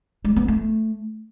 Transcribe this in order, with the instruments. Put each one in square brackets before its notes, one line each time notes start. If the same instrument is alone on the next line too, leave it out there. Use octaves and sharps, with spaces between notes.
[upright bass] G#3
B3
A3